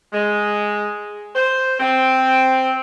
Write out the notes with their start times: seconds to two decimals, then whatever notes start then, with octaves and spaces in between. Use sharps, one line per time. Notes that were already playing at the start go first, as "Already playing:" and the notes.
0.13 G#3
1.35 C5
1.80 C4